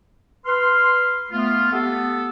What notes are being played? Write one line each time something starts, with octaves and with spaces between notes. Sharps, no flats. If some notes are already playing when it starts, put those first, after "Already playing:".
B4 C6 F6
A3 B3 F4
B3 G4 A4